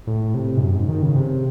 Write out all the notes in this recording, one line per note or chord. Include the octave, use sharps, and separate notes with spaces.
A2
C3
G#2
F#2
G#2
D#3
C#3
C3